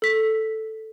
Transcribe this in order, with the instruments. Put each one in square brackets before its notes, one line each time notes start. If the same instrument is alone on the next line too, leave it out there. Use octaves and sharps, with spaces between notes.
[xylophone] A4 B6